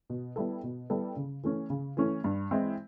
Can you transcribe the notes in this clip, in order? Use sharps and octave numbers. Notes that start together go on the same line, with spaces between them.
B2
G3 B3 E4 A4
B2
G3 B3 E4 A4
C#3
E3 A3 C#4
C#3
E3 A3 C#4
G2
E3 G#3 C4 E4